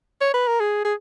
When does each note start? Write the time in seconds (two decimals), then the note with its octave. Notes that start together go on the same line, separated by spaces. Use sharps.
0.21 C#5
0.34 B4
0.47 A#4
0.60 G#4
0.84 G#4